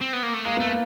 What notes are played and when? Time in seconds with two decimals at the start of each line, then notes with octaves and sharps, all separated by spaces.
0.01 C4
0.13 B3
0.23 A#3
0.34 A3
0.45 G#3 A#3
0.57 A3 B3
0.68 A#3